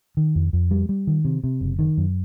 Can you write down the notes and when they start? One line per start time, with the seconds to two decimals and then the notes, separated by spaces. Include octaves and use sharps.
0.17 D#3
0.35 F2
0.53 F2
0.71 G3
0.89 G3
1.07 D#3
1.25 C3
1.44 C3
1.61 F#1
1.79 D#3
1.98 F#2